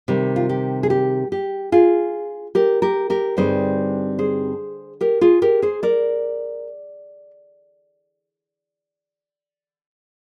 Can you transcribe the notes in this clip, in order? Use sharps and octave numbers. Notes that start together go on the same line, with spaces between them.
C3 D#3 G3
F4
G4
G#4
G4
G4
F4 G#4
G4 A#4
G4 A#4
G4 A#4
G2 D3 G3 C4 D#4 G#4 C5
G#4 C5
G4 A#4
F4 G#4
G4 A#4
G#4 C5
A#4 D5